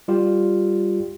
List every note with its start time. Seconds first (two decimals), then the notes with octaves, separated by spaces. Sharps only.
0.08 G3 F4 G4